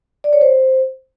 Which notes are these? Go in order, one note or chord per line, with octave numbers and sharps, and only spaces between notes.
D5
C#5
C5